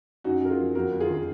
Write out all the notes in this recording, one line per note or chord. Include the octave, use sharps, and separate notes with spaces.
F#2 D#4 F#4
F#2 A#4
F4 G#4
F3
F2 F#4 A#4
F2
F4 G#4
D#3